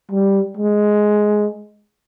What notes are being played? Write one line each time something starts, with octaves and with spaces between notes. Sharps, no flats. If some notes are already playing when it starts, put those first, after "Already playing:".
G3
G#3